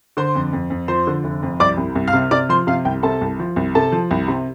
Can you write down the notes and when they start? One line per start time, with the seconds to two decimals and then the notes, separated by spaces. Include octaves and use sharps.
0.17 D3 C5 C6
0.35 F2
0.53 F2
0.70 F2
0.88 F3 C5 C6
1.07 D3
1.24 F1
1.43 F2
1.60 C2 D5 D6
1.78 C2
1.95 C2
2.08 F5 F6
2.13 C3
2.31 C3 D5 D6
2.49 F3 C5 C6
2.67 C3 F5
2.85 C2 G5
3.03 C3 A4 A5
3.21 C2
3.39 F3
3.56 C2
3.75 C3 A4 A5
3.92 F3
4.11 C2
4.28 C3